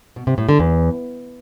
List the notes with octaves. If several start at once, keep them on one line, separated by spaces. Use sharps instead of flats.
B2
C3
A2
D3
E2